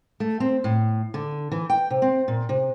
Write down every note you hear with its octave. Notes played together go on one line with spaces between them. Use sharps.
A3
C4
A2
D3
E3
G5
C3
C4
A#2
C3